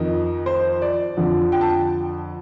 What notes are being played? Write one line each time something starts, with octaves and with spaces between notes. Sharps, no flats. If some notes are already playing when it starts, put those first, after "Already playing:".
Already playing: F2 D#3 D#4
C5
D5
F2 D3 F3
G5
A5